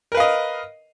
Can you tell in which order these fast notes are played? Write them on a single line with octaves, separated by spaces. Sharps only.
A#4 B4 F5 D#5